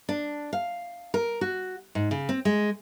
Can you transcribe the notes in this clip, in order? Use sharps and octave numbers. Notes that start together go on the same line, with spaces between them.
D4
F5
A#4
F#4
G#2
C#3
C4
G#3